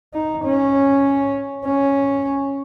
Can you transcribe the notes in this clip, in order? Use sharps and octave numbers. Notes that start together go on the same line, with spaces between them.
D#4
C#4
C#4